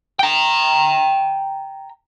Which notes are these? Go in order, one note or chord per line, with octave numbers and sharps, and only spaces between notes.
G5 A#5